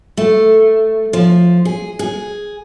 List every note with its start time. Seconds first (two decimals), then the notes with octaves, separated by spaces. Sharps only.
0.17 A3
1.13 F3
1.65 G#4
1.99 G#4